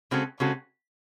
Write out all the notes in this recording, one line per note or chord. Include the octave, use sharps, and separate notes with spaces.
C#3 G#3 C4 F#4 A4
C#3 G#3 C4 F#4 A4